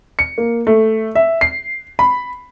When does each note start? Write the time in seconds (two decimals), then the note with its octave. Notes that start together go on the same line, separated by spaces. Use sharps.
0.19 C#7
0.38 A#3
0.67 A3
1.15 E5
1.41 C7
1.99 B5